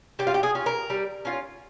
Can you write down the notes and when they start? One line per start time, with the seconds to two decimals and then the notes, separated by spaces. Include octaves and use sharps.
0.19 G3 G4
0.27 F4
0.34 G4
0.43 G#4
0.55 C#4 F4
0.66 A#4
0.90 G3
1.25 C#4 F4